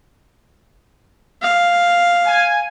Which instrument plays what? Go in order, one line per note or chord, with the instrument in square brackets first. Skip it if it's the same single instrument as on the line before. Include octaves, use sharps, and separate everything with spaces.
[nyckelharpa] F5
[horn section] G#5